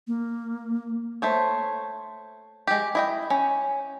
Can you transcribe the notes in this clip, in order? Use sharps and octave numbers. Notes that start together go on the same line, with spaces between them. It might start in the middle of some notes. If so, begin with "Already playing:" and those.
A#3
A3 C5 C#5
G#3 G4
E4 D#5 G5
C#4